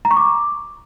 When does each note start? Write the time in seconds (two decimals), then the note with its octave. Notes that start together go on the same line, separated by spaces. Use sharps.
0.05 A#5
0.11 C#6
0.17 D6